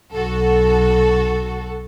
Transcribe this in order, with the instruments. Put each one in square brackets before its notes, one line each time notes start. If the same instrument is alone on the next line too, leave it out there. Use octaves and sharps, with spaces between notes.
[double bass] B1 [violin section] F#4 A4